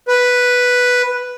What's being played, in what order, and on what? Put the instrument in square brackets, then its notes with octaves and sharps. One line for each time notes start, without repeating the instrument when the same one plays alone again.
[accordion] B4